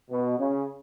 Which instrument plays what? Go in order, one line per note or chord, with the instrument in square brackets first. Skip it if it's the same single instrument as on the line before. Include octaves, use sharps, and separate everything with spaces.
[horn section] B2
C#3